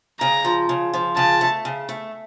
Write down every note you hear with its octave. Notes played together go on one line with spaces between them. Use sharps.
C#3 A#5
F3
C#3
F3
C#3 A5
A3
C#3
A3